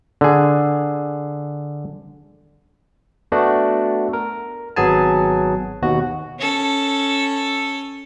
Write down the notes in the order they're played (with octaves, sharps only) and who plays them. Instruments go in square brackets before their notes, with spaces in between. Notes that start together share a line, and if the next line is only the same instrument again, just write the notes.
[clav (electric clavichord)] D3 G#4
[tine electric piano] A3 B3 D4 F#4
A#4
G#1 F#3 B3 G#4 G#5 A5
D#2 B2 F#4
[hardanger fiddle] C#4 A4